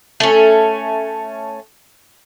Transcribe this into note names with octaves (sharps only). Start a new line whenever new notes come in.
A3 C#4